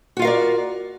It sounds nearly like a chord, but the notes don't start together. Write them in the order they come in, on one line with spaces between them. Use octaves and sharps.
F#4 F4 F5 A#4 D5